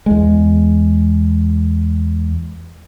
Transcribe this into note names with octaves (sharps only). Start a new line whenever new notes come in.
E2 G#3